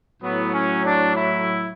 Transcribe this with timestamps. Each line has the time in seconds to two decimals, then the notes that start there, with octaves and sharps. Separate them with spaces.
0.21 A2 F#3 B3
0.53 C#4
0.84 D4
1.15 E4